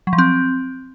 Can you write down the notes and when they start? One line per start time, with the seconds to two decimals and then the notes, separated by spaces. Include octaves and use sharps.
0.07 F#3
0.13 F3
0.18 C4